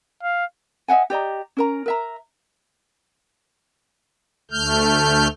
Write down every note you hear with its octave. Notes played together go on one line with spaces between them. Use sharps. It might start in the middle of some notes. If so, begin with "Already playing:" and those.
F5
D#5 E5 F#5 G#5
G4 D5 D#5 A#5
C#4 A#4 A#5
A#4 E5 A#5
D2 A3 F6 G6